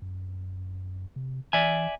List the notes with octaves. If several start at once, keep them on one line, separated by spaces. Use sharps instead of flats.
F#2
C3
E3 D5 E5 G#5